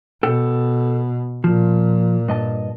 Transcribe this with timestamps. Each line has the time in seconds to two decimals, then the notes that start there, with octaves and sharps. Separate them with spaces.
0.23 B2 A4 G5
1.44 A#2 F3
2.28 G2 D#5 A5